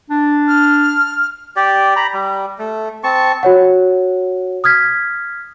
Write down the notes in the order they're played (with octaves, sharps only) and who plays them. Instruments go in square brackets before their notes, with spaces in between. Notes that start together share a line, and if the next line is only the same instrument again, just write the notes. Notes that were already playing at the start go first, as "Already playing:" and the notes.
[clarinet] D4
[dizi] F6
[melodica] G4 D5
A#5 B5
G3
A3
C4 A5 C#6
[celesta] F#4 C#5 F#5
D#6 F6 G#6 B6